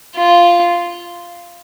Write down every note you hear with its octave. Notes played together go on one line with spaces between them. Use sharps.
F4